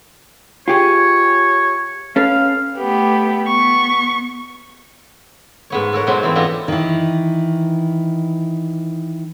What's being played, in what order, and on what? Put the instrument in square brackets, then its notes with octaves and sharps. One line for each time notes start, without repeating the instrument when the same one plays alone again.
[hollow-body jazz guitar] F4 G4 G#4 [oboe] C#5
[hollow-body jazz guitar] C#4 A4 B4 [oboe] F5
[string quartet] A3 B3 G4
[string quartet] B3 [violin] C#6
[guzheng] G#2 B3 C#5
A4 A#4 C#5 F#5
G#2 B2 F#3 B3 C5
E3 B3 C4
B3 D4 F4 A4 D#5 A#5
[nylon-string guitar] D#3 E3